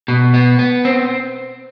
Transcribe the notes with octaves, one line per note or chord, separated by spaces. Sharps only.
B2
B3
B3
C4